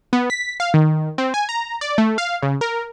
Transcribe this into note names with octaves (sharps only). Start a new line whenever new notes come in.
B3
B6
F5
D#3
C4
G#5
A#5
D5
A3
F5
C#3
A#4